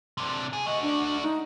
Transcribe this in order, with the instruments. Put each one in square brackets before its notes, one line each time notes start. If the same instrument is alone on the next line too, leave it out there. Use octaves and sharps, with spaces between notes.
[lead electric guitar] C3 D4
G#4
[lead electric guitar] A3 F#4 [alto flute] D#5
[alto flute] D4
D#4